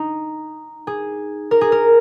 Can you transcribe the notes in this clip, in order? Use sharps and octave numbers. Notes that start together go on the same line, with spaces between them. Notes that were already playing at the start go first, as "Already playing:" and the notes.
Already playing: D#4
G#4
A#4
G#4
A#4